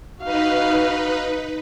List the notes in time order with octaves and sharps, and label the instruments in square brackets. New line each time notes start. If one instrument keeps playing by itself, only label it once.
[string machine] D#4 B4 [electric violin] F#4 F5